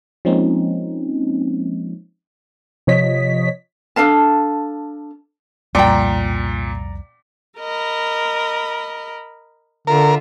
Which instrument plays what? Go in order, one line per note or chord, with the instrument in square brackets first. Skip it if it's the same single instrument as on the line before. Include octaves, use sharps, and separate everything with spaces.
[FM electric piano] F3 G#3 A#3 C4 C#4 D#4
[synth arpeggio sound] C3 F3 C#5 D#5 B6
[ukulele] D4 A4 F5 A5
[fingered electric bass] C2 F2 G3 [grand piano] A#2 [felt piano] D5 A#5 [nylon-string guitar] G5 G#5
[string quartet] A#4 D#5 B5
[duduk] D3 [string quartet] F4 E5 [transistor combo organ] A#4